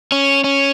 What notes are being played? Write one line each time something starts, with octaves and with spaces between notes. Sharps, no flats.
C#4
C#4